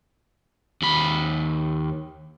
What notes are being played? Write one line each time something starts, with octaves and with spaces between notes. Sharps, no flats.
D#2 B5